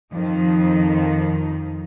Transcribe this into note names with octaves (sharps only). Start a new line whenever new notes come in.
F2 D#3 F3